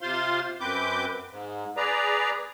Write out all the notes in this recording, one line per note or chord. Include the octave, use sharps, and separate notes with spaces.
C3 F4 C5 F5 C6
F#2 C4 B4 D6 G6
G#2
G#4 B4 D5 A#5